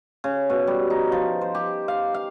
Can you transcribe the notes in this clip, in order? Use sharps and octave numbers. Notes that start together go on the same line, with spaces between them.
C#3
B2
G3
D#4
F3
C5
G4
F5
F5